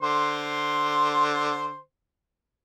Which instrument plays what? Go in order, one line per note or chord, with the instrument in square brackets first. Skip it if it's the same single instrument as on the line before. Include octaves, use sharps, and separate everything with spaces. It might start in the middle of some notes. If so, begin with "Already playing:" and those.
[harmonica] D3 C5 C6